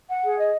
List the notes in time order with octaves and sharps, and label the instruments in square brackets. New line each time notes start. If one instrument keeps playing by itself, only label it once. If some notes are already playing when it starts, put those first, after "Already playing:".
[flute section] F#5
G#4
D#5